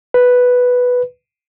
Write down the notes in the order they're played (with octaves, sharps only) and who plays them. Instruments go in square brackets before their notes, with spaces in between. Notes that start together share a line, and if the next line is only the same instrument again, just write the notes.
[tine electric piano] B4